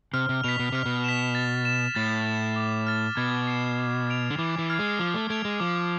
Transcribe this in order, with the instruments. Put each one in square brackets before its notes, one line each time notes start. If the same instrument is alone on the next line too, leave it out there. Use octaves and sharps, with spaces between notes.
[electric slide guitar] C3 [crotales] F6
[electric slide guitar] C3
[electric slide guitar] B2 [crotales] B6 F7
[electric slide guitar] B2
[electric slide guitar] C3 [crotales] F6
[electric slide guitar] B2
[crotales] B6 E7
A6
E7
[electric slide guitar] A2 [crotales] A6
[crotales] E7
D6
F6 A6
[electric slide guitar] B2 [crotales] G#6
[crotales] C7 E7
D6
G#6 D7 F7
[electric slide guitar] D3
[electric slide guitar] E3 [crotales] D6
[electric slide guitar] E3
[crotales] F6 G#6 C7
[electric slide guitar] G#3
[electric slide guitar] F3 [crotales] D6
[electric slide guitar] A3
[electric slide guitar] A3 [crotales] G#6 D7 F7
[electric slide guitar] G#3
[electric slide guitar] F3 [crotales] D6